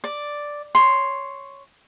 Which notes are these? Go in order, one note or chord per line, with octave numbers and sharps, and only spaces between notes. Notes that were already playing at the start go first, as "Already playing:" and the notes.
D5
C#5 C6